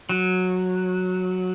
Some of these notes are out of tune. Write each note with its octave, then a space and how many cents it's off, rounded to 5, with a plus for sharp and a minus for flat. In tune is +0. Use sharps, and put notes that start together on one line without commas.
F#3 -10